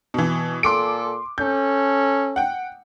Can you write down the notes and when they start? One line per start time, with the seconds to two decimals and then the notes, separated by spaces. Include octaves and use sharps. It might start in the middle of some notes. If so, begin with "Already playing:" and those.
0.14 B2 E3
0.63 A#2 A4 C6 D6 D7
1.38 C#4 A4 G6
2.36 F#5 G5